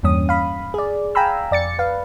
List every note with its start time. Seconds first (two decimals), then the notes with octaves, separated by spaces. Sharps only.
0.03 E2 G2 A#2 C#4 D#6
0.29 F5 B5
0.74 G#4 D5
1.15 F5 G5 G#5 A#5 B5 E6
1.51 F2 D5 A6 C#7
1.79 B4 F5